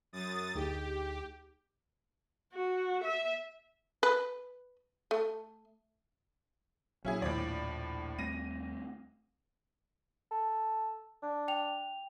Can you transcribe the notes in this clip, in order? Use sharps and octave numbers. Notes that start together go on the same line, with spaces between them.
F#2 D#6 A6
D2 D#4 G4 G#4
F#4
E5
B4
A3
A#1 F#3 C#4 E4 G#4
D#2 A2 F3 D5
G3 A3 C4 A#6 D#7
A4
D4
G5 F7